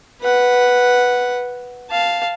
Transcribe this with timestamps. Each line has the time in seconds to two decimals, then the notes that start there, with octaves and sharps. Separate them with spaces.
0.22 B4 F#5
1.91 F5 A5